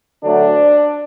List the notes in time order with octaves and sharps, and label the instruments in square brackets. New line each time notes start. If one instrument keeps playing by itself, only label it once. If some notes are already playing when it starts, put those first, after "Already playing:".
[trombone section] D2 D3 F#3 D4